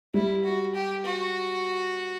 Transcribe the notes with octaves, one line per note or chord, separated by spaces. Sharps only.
G3 E4
F#4
G4
F#4